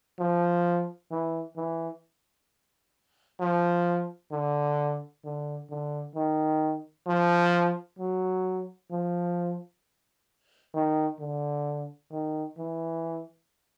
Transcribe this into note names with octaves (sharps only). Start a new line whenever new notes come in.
F3
E3
E3
F3
D3
D3
D3
D#3
F3
F#3
F3
D#3
D3
D#3
E3